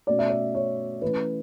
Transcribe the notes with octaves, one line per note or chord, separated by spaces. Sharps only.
B2 A3 C#4 D5
E5
D5
C#5
E3 A3 C#4 B4